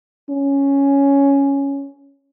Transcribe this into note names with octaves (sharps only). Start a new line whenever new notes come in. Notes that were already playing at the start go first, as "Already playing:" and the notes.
C#4